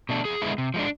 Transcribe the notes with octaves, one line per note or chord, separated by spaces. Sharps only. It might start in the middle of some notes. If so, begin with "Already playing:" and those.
B2 A3 D4
F2 G#4
D3 G#3 B3 E4
C3
F3 G#3 D4